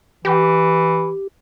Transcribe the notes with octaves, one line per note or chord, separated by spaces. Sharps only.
E3 G4